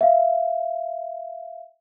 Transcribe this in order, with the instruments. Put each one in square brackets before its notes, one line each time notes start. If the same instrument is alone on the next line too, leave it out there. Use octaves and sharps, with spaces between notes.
[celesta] E5 F5